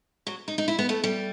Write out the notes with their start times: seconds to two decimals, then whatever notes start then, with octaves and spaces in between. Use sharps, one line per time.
0.27 F#3
0.48 D#4
0.58 D#4
0.68 E4
0.79 B3
0.89 A3
1.04 G3